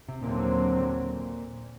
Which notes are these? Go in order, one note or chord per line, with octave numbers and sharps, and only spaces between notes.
C3
D#2 A#2 D3 F#3 C4